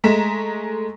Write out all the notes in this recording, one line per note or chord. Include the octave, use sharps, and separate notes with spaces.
G#3 A3 A#5 B6 E7